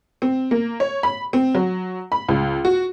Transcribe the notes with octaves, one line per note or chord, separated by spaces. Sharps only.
C4
A#3
C#5
B5
C4
F#3
B5
C#2
F#4